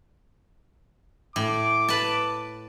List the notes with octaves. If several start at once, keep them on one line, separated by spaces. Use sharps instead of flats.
A2 D6
B4 A5